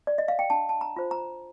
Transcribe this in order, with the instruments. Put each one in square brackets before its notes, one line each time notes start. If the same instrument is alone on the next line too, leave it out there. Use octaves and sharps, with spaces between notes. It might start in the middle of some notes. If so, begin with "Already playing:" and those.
[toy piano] D5
D#5
F5
G5
D4 A5
A5
A#5
F4 C5
A#5